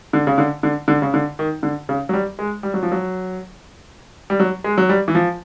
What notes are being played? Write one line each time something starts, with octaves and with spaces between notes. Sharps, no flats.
D3
C#3
D3
D3
D3
C#3
D3
D#3
D3
C#3
F#3
G3
G#3
G3
F#3
F3
F#3
G3
F#3
G#3
F#3
G3
E3
F3